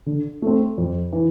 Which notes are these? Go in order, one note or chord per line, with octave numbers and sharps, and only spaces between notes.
D3
A3 C4
F2
E3